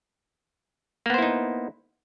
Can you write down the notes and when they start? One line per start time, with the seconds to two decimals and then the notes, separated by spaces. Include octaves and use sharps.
1.06 A#3
1.10 B3
1.14 C5
1.18 E4
1.22 D#4